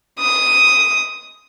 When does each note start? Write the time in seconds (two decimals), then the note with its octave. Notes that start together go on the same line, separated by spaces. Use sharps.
0.20 D#6